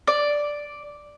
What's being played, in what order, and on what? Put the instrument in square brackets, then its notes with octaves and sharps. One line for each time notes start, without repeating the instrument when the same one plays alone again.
[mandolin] D5